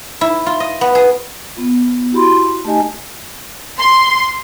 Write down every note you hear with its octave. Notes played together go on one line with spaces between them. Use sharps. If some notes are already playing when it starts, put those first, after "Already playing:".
E4
F4
D#5
B3
G#4
B3 F4
E4 F#4 G4 B5 C6
A3 D#4 G4 D#5 G#5
C6